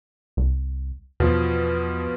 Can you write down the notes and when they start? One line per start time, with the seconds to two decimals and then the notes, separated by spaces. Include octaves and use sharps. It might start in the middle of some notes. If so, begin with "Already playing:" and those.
0.37 C2
1.20 E2 B2 F3